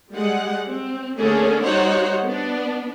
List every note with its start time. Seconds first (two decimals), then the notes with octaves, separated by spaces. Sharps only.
0.14 G3 G#3 F#5
0.69 C4
1.19 D3 A3 A#3 C#4 D4 G#4
1.65 G3 D#4 F#4 C5 C#5 F#5
2.26 B3 D4